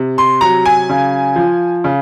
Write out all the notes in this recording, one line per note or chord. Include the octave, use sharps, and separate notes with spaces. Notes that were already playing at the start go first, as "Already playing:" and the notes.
Already playing: C3
C6
F#3 A#5
G#5
C#3
F3
C#3